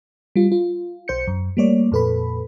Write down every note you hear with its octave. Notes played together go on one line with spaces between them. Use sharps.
G3 F4
F4
B1 C5 G6 C#7
F#2
G3 A3 A#3 C#5 D5
F2 A#2 A4 B4 B5